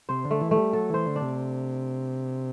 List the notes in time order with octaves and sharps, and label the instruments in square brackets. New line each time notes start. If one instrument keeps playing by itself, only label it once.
[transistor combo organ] C3 [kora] C5
[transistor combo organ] D3
[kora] A3
[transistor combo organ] E3
[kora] A3
[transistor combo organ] G3
[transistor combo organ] F#3 [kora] A4
[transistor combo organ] E3 [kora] C5
[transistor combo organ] D3
[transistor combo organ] C3 [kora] D4